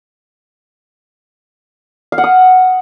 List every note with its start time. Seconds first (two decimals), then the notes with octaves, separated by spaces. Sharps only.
2.12 F5
2.18 F#5
2.24 D#6